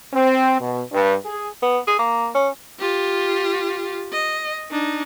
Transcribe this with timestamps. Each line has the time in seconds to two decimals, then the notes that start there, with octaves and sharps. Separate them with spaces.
0.13 C4
0.61 B2
0.92 G2
1.24 G#4
1.63 B3
1.87 G#4
1.99 A#3
2.35 C#4
2.79 F4 G4
4.12 D#5
4.71 D4 D#4